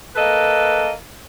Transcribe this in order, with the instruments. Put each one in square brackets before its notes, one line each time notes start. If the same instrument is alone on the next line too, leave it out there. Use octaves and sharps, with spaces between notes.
[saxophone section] A#3 A4 B4 D#5